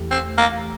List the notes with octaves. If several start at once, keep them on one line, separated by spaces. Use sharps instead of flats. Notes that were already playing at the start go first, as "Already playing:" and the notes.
Already playing: E2 E3 A3 G4
C4
A#3